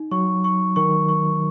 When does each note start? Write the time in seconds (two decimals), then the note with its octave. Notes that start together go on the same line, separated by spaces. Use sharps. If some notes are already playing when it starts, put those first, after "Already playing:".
Already playing: D#4
0.11 F#3 C#6
0.44 C#6
0.76 D#3 C#6
1.09 C#6